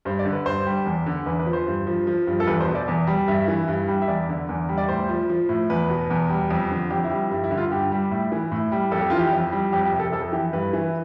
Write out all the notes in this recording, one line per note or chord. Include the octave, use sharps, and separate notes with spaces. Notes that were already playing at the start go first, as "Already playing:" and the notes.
G2 C5
D5
D3
B4
G2 C5
G3
E2
D3
E2 B4
B4
F3
C5
G2
F3
F3
G2
A4
E2 B4
C5
B2
D5
E2
G3
G2 E5
E3
G2
G3
E5
E2 D5
D3
E2
G3
D5
A2 C5
F3
F3
A2
E2 B4
B2
E2
G3
F2
D3
F2 G4
E4
G3
G2 E4
E4
D3
F4
G2 G4
G3
A2
E3
A2
G3
F2 A4
G4
E3 F4
G4
F2
G3
F2 G4
G4
C3
A4
F2 A4
E3 G4
G2 B4
E3